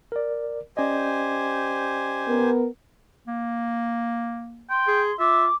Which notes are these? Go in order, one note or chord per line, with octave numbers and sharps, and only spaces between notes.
A#4 D5
C#4 G4 C5 D5 D#5 G#5
B3 A#4
A#3
G5 C6
G#4
F4 E5 D6